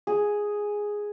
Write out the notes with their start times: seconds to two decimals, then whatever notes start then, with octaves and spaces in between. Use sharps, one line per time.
0.07 G#4